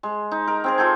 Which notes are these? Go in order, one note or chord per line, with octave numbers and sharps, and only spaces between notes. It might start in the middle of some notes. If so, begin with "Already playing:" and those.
G#3
D#4
A#4
C4 G#4 A#4
F4 A4 G5 G#5